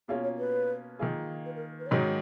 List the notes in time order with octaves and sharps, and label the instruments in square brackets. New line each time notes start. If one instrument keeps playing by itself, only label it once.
[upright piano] B2 A#3 C#4 F4 [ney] G#4
[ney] C#5
B4
[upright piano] D#3 A#3 F4 G#4
[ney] B4
A#4
B4
C#5
[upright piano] G#2 D#3 F#3 C#4 [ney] D#5